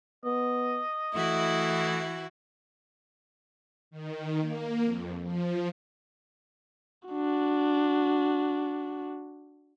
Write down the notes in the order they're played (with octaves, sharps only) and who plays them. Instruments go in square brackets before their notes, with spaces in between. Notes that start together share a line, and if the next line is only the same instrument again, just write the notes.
[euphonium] B3 [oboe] D#5
[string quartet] E3 E4 F#4 [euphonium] A3
[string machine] D#3
A#3
F2
F3
[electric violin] D4 F#4